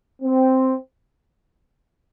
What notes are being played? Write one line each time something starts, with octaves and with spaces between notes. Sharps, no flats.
C4